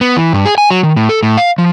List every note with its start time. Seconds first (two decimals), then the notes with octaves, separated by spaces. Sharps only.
0.01 B3
0.17 E3
0.33 G2
0.45 G#4
0.58 G#5
0.71 F#3
0.83 D#3
0.96 A2
1.09 A4
1.23 A2
1.37 F5
1.58 F3